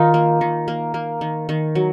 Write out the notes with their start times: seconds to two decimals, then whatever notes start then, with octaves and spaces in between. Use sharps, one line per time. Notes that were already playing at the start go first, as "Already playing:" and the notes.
Already playing: D#3 D#4 F4
0.14 A#3
0.41 D#3
0.68 A#3
0.94 A#3
1.21 D#3
1.49 D#3
1.75 F#3